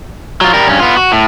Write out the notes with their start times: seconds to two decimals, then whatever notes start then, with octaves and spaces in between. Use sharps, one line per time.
0.41 F#3 F4
0.54 G3 A#4
0.67 G2 C#4
0.80 B3 F4
0.97 F#4
1.12 A2